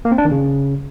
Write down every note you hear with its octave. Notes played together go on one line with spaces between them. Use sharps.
A#3
C4
D4
D#3
C#3